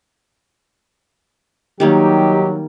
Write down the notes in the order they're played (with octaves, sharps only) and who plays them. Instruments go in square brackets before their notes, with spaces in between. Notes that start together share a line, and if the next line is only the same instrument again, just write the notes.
[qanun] D#3 G3 A#3 [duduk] F#3 [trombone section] D#4 G4